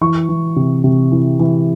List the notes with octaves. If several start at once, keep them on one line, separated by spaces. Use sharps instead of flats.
E3 C#6
E3
C3
C3
E3
E3